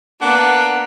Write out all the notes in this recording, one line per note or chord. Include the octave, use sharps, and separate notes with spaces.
A#3 B3 D4 F#5